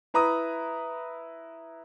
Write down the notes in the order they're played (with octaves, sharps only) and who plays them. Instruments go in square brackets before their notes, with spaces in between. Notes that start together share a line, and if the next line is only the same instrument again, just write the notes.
[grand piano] E4 B4 A#5 B5 D#6